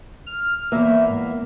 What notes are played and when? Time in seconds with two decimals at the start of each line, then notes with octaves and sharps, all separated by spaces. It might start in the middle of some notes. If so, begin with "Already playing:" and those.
0.26 F6
0.72 E2 A#3 E5
1.09 G#2